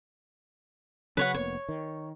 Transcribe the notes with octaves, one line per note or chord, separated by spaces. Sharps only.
C#3 F#3 C#4 B4 C#5 F#5
F1 A#3 B3 C#5
D#3